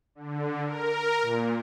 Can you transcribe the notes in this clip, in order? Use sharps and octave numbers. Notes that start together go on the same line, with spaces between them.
D3
A#4
A#2